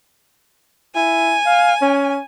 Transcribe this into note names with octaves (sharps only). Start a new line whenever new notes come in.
E4 G#5
F5
C#4